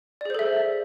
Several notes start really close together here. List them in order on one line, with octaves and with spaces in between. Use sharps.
D5 G#4 C5 A4 E5